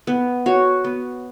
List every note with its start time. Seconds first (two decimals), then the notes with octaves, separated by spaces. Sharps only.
0.07 B3
0.46 F#4 C#5
0.84 B3